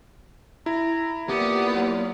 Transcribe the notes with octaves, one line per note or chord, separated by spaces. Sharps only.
E4 A#5
A#3 B3 F4 G4 D5
F#3